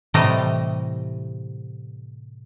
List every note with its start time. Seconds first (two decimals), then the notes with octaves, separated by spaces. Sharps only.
0.14 A2 C3 E3 G3 A3 D#5